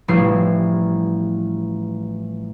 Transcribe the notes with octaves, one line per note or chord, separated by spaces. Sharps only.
A1 F3 G3 E4 C7